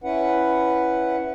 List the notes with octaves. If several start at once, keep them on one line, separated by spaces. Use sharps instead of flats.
C#4 E4 B4 F#5